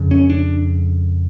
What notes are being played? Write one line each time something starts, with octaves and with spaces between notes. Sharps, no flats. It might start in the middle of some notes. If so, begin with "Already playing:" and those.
Already playing: F2 C#3
C#4
D4